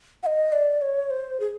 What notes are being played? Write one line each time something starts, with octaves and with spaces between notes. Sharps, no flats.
F#5
D#5
D5
C#5
C5
G#4